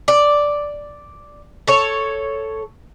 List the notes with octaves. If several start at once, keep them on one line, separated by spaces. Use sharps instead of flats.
D5
A4 C#5